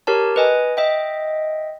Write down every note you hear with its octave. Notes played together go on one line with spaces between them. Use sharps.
G4 A#4 C#5 A5
B4 D#5 G#5
D#5 E5 G5